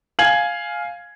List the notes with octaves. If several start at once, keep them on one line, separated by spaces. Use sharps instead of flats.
F5 G#5 G#6 F#7